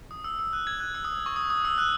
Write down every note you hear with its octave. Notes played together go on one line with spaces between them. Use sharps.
D#6
E6
E6
F#6
G#6
F#6
E6
D#6
C#6
D#6
D#6
E6
F#6